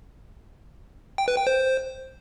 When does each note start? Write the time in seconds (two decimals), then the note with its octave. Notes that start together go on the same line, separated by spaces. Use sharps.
1.18 G5
1.28 B4
1.37 G5
1.47 C5